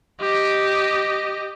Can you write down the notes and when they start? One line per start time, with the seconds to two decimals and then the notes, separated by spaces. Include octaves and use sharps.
0.21 G4 D#5